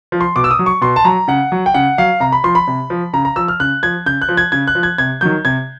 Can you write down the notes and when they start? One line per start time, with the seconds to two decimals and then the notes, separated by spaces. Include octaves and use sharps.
0.12 F3
0.21 C6
0.36 B2 D6
0.44 E6
0.51 D#6
0.59 F#3
0.66 C#6
0.81 B2 C6
0.96 A5
1.05 F#3 A#5
1.28 C#3 F#5
1.52 F#3
1.66 G5
1.74 C#3 F#5
1.98 F#3 F5
2.20 C3 A#5
2.32 B5
2.44 F3 C6
2.55 B5
2.68 C3
2.90 F3
3.13 C#3 A#5
3.25 A#5
3.36 F3 E6
3.48 F6
3.60 C#3 F#6
3.83 F3 G#6
4.06 C#3 G6
4.22 F#6
4.29 F3
4.37 G#6
4.52 C#3 G#6
4.67 F#6
4.75 F3
4.83 G#6
4.98 C3 G#6
5.21 D#3 F#3 G6
5.45 C3 G#6